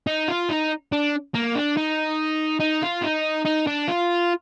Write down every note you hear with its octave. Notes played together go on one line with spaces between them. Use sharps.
D#4
F4
D#4
D4
A#3
D4
D#4
D#4
F4
D#4
D#4
D4
F4